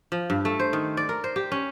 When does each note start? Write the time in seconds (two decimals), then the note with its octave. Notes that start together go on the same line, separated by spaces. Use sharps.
0.12 F3
0.30 G2
0.45 A3
0.60 C5
0.73 D#3
0.97 D5
1.09 A#4
1.24 C5
1.36 G4
1.52 C#4